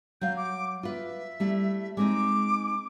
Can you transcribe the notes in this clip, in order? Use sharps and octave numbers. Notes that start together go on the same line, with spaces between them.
F#3 F5 G6
D6
F4 B4 E5
G3 A3 E4
G#3 C4 D#4 D6